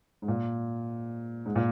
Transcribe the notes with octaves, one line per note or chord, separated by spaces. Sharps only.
G#2
A#2
G#2
A#2